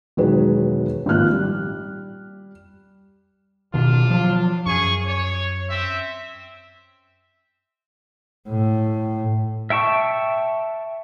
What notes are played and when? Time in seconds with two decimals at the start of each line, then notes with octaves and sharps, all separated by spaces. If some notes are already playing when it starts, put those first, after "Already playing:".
0.17 E1 D#3 F#3 G#3 B4 C#5
1.06 G#1 A#2 F3 F6 F#6
1.31 G3
3.74 B2 D#3 D4 F4
4.10 F3 F#3
4.66 F#2 G#4 G#5 C#6
5.06 C#5
5.70 C4 E5
8.48 A2
9.70 E5 G5 A5 C#6